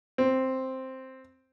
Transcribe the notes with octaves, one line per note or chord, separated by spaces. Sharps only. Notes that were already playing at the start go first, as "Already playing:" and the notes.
C4